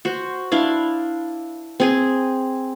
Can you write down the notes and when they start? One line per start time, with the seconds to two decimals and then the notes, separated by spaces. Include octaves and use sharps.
0.05 F#4 C5
0.52 D4 E4 F5
1.80 C4 G#4 G#5